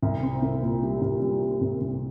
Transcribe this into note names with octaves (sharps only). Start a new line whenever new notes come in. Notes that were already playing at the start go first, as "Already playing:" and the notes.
C2
C4
C2
A#2
G3
C2
G3
C4
C2
C2